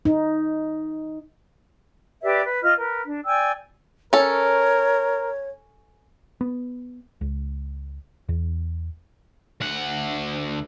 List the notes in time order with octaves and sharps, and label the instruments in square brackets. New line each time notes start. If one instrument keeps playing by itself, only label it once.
[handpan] D#4
[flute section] G4 B4 D5 E5
B4
F4 D#5 F6
A#4 B4
D4
D5 G5 G#5 E6
[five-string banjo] C#4 A4 [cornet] A#4 [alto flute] C#5
[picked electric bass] B3
C#2
E2
[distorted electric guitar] D2 F#5